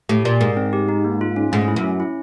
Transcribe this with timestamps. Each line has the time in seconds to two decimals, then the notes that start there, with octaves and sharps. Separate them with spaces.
0.09 A2 G4
0.25 A#2 D5
0.41 G#2 A#4
0.57 C4
0.73 G4
0.89 D#4
1.04 A#3
1.21 F4
1.36 C#4
1.52 G#2 A3
1.68 E4
1.76 F#2
1.84 C#4
2.00 E4